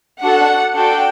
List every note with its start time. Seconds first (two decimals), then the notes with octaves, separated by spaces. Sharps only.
0.22 D4 F#4 A4 F#5
0.75 D4 F#4 A4 G5